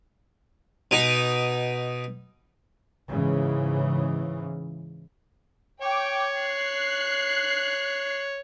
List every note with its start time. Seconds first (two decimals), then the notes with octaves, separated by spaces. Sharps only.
0.91 B2 D#4
3.09 G#2 C#3 E3
5.82 C#5 G5 D6
6.39 F#6 C7